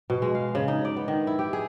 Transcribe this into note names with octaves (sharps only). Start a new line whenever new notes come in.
B2
G#3
F5
C#3
D#4
D5
B3
D#3
E4
G4
G#4